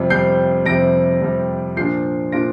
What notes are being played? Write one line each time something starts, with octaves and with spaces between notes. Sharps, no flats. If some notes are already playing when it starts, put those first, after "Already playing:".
Already playing: F2 C3 G3
F2 C3 G3 G6 C7
F2 C3 G3 A#6 D7
F2 C3 G3
A#2 F3 D4 F4 G6 C7
A#2 F3 D4 F4 A#6 D7